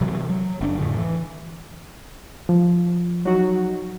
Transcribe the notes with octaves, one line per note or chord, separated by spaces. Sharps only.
C3 E3 F#3 G3
F#3
F#1 C4 D4
F2 A2 D3
E3
F3
F#3 D#4 F#4